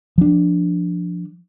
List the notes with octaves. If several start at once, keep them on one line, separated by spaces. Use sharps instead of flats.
F3 D4